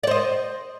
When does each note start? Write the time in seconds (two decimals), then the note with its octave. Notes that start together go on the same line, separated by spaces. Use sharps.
0.03 D5
0.07 C5
0.11 D#5